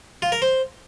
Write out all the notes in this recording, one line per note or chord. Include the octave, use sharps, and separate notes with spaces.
F4
A#4
C5